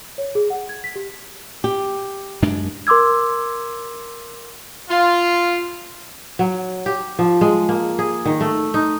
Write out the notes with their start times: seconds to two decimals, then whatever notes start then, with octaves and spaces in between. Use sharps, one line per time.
0.18 C#5
0.35 G#4
0.50 F#5
0.69 G#6
0.84 B6
0.96 G4
1.64 G4
2.42 F#2 G#3 D4
2.87 A#4 C6 D6 E6 G#6
4.90 F4
6.39 F#3
6.86 G4
7.19 F3
7.41 G#3
7.69 A#3
7.99 G#4
8.25 D#3
8.41 A3
8.74 D#4